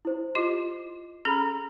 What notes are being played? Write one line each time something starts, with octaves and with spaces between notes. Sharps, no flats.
E4 C5
E4 F4 G4 D#5
C#4 G#4 A4 A#5 B5